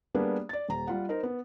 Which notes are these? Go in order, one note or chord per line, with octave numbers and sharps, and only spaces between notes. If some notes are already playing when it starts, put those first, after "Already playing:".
G3 A#3 B3 D4 G#4
D5 A6
D#1 A#5
G3 F4 F#5
D#4 A#4 C5
B3